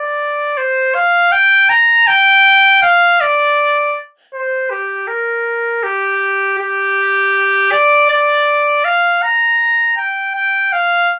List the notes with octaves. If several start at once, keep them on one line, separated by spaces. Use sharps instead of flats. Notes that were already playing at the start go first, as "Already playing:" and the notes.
Already playing: D5
C5
F5
G5
A#5
G5
F5
D5
C5
G4
A#4
G4
G4
D5
D5
F5
A#5
G5
G5
F5